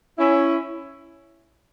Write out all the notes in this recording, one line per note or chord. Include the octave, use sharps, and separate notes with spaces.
C#4 E4